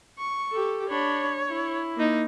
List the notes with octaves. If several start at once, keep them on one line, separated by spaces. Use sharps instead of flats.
C#6
G4 A4
D4 C#5 B5
E4
A#3 D#4